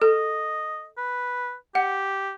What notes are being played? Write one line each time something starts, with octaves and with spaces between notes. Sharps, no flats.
A4 D#5
B4
G4 F#5